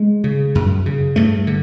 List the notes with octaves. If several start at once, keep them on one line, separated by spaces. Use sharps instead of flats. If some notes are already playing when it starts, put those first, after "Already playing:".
Already playing: G#3
C#3
F#2
C#3
G2 A3
D3